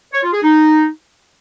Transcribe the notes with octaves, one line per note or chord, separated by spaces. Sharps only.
C#5
F4
G#4
D#4